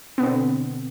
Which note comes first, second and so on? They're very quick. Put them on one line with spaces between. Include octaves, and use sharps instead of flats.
B3 B2 C4 D3